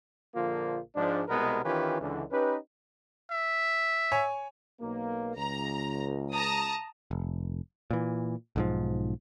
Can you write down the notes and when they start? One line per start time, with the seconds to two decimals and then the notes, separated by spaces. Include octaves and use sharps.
0.35 A#1 D3 F3 A#3 F4
0.96 G#2 F3 G#3 D4
1.29 C2 B2 G#3 B3 A#4 B4
1.65 D#3 E3 C#4 F4 G4 B4
2.01 C#2 D3 E3
2.31 C#4 D#4 G4 B4
3.31 E5
4.12 C#5 G#5
4.81 B1 A#3
5.36 C#2 A#5
6.32 A5 A#5 D#6
7.11 F1
7.91 A#2 E3
8.56 B1 G#2 F3